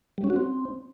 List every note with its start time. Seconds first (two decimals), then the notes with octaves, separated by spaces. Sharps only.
0.18 G3
0.24 C#4
0.30 F#4
0.36 C4